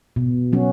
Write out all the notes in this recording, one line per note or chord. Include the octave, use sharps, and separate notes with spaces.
B2
F#3 C#4 F#4